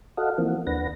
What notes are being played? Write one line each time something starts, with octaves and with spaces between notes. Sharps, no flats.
F#4 A4 D#5 F5 F#5
E3 F3 A#3 C4
D#2 D4 B4 F#5 A#6